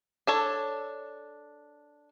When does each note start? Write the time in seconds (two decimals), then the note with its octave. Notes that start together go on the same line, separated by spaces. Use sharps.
0.27 D4 A4 C#5